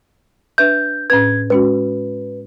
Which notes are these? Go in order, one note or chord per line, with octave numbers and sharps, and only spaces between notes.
D4 B4 E5 G6
A2 C#4 B4 G#6
G#3 C#4 F#4 B4